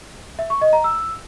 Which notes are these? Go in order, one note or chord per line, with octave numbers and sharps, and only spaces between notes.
E5
C#6
D#5
A#5
E6